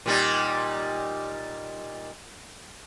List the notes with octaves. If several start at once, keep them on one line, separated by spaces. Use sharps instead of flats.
A#2 G3 D#4